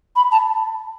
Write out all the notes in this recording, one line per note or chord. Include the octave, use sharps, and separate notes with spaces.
B5
A5